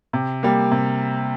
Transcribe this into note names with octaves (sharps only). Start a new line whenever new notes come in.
C3
G3 A#3
C3